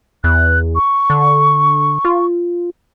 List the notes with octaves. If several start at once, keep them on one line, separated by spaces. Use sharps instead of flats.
E2 F#6
C#6
D3
F4